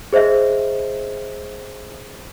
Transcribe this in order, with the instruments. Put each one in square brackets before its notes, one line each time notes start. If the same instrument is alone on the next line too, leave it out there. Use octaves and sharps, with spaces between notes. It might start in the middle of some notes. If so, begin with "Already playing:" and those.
[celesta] G#4 C5 D#5 E5